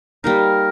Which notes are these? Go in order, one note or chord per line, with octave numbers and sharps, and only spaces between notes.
G3 A#3 D#4 A#4